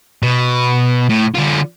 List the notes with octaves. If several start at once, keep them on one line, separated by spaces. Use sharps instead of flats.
B2
A2
D3 F4